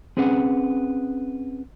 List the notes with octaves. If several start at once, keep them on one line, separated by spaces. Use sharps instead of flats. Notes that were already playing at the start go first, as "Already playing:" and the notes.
C4 C#4 G#4 B4 F#5